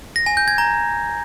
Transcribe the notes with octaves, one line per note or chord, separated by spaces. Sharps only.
A#6
G#5
G6
G#6
A#5